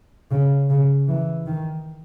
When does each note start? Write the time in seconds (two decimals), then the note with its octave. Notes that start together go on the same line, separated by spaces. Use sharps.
0.31 C#3
0.69 C#3
1.08 E3
1.46 D#3